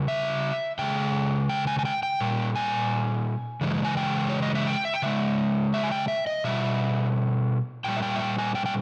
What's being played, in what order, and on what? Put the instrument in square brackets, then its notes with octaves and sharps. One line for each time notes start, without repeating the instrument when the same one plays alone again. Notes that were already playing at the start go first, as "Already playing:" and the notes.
Already playing: [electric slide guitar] C#3 G3
E5
C#3 G#3 G5
G5
G#5
G#5
G5
G5
A#2 G3
G#5
C#3 E3 G#3
G#5
G5
C#5
D#5
E5
G5
E5
G5
C#3 G#3 E5
E5
G#5
G5
E5
D#5
B2 G3 E5
A#2 G3 G5
E5
G5
E5
G5
G#5
G5
G5